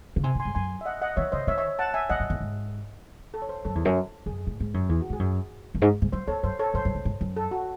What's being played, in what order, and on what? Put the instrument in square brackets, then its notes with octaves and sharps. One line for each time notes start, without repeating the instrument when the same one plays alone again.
[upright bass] C#3
[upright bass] C3 [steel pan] G#5 C6
[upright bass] A2
[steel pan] G#5 C6
[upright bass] G#2
[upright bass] F#2 [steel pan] G#5 C6
[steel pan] E5
D#5 F#5
D#5 F#5
[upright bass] E3 [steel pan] C#5 E5
[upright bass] C#3 [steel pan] C5 D#5
[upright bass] D#3 [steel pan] C#5 E5
[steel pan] C#5 E5
F#5 A5
E5 G#5
[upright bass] E2 [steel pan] D#5 F#5
[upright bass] F#2
E2
G#2
[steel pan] A4
C#5
C5
[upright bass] F#2 [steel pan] A4
[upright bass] E2
F#2
[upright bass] F#2 [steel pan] G#4
[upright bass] A2
G#2
F#2
[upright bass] E2 [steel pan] G#4
[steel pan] F#4
[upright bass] G#2 [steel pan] G#4
[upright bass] F#2
F#2
G#2
G#2
[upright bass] F#2 [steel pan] C5
[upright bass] E2 [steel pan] A4 C#5
[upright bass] F#2 [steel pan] C5
[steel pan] A4 C#5
[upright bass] F#2 [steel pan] C5
[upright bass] F#2
G#2
G#2
F#2
[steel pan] A4
F#4